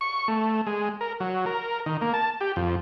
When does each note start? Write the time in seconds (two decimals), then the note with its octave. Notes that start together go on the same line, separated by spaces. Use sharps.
0.01 C#6
0.28 A3
0.67 G#3
1.01 A#4
1.20 F#3
1.46 A#4
1.86 D#3
2.01 A#3
2.14 A5
2.41 G4
2.56 F2